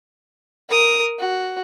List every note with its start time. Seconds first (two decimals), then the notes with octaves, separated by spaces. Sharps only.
0.70 A#4 D#6
1.19 F#4